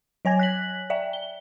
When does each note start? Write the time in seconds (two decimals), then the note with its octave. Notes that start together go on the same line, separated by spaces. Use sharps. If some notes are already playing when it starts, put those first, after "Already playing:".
0.25 F#3 C#5 G#5 G#6 A#6
0.39 F#6 B6 F#7
0.90 D5 E5 G5
1.13 G7